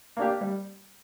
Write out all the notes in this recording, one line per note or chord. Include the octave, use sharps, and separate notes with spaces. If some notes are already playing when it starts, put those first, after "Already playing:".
A#3 D4 G4
G3